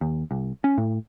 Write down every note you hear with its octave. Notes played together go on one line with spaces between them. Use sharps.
D#2
C2
C#4
A2